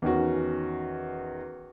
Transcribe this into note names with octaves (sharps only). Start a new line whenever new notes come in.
E2 D#3 C#4 F#4